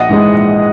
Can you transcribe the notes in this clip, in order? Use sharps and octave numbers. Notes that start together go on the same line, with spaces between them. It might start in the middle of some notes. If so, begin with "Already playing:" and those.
Already playing: A#1 D#5 F#5
G#2 E3 G#3
A#1